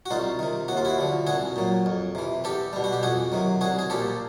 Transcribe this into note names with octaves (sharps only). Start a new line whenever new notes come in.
F#4
C2 D#4 F4
C3 D#3
D#2 F#4
F4
E4 F#4
D3 F3
C2 F#4 G#4
A#2 F#3
F2
C3 E3
E2 G4 A4
B2 G3
F#4
G4
F2 F#4 G#4
C3 D#3 F#3
C2 F#4 G#4
G#4
A#2 F3 G4 A4